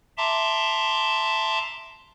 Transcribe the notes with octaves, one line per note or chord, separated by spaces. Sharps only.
E5 A5 A#5 C6 D6